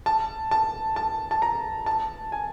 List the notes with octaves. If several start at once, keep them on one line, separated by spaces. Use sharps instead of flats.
A5
A5
A5
A5
A#5
A5
G#5